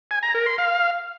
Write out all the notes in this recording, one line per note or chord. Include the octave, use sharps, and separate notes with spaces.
G#5
A#5
A#4
C6
F5